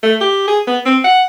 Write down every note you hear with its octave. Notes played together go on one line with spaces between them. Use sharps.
A3
G4
G#4
B3
C4
F#5